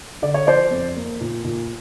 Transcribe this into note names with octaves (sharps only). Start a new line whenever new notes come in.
D3 D5
C#5
F3 C5 D5
F2
A#3
A#2
A#2